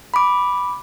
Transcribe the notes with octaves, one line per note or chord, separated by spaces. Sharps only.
B5 D6